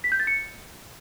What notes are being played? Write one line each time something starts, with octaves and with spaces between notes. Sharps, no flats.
B6
G6
A6
C#7